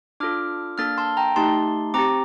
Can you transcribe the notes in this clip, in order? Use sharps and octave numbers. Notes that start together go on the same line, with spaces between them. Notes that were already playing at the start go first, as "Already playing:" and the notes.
D4 F4 A4 D6 F6
A#3 D4 A4 F6 A6
A5 C6
G5 A#5
A3 D#4 G4 A5 C6
C4 G4 A#5 D6